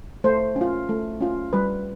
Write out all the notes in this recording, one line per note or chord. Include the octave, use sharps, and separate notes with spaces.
A3 C5
C#4
F4
A3
C#4 F4
G3 B4